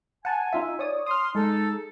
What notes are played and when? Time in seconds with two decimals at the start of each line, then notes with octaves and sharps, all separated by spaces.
0.25 F#5 G#5 A5
0.53 D#4 F4 E5
0.79 C#5 D5 D#6
1.06 C6 D#6 F6
1.35 G#3 D#4 A4